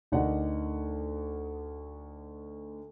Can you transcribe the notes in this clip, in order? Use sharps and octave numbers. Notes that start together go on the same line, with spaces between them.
D2 D3 D#4 G4 A#4 F#5